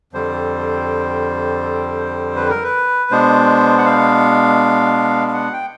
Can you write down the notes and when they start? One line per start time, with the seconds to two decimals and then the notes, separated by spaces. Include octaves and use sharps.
0.13 F2 D3 G3 C5
2.36 B4
2.50 A#4
2.64 B4
3.11 B2 G#3 B3 D4 C5
3.78 F#5
3.85 F5
5.28 F5
5.34 F#5
5.53 G5